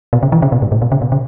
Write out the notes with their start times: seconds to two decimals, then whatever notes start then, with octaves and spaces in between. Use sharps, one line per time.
0.13 B2
0.23 C#3
0.32 E3
0.42 C#3
0.52 B2
0.62 G#2
0.72 A2
0.82 B2
0.92 C#3
1.02 B2
1.12 C#3